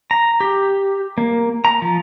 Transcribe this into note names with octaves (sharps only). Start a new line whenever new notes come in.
A#5
G4
A#3
A#5
F3